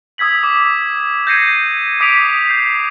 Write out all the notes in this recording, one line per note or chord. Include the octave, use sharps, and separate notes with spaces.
D#6 E6 G#6 B6 F#7
D6
G6 G#6 A#6 C7 C#7 D#7
D6 D#6 B6 D7 F7
G6 C7